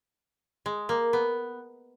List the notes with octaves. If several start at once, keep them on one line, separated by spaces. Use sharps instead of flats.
G#3
A#3
B3